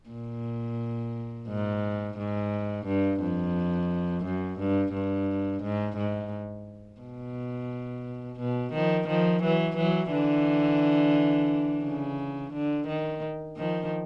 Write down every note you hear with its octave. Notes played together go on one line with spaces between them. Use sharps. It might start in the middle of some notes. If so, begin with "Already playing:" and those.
A#2
G#2
G#2
G2
F2
F#2
G2
G2
G#2
G#2
B2
B2
D#3 F3
D#3 F3
E3 F#3
E3 F#3
D3 E3
C#3
D3
D#3
D#3 F3